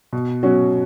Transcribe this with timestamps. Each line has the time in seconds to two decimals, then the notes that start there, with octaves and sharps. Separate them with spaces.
0.13 B2
0.43 F#3 C#4 F#4